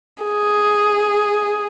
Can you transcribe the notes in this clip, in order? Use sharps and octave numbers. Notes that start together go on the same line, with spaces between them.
G#4